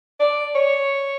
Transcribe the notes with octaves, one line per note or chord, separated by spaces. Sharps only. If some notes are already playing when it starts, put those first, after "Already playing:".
D5
C#5